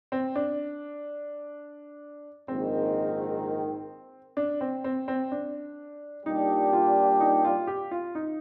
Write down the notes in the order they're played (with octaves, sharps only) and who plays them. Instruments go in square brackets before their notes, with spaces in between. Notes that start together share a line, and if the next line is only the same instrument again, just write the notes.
[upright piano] C4
D4
[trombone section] A#1 G#2 D#3 [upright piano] C4
[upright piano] D4
C4
C4
C4
D4
[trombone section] A#2 G3 D4 G4 [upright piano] D#4
[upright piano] F4
D#4
F4
G4
F4
D#4